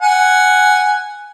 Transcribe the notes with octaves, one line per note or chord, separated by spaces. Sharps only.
F#5 G#5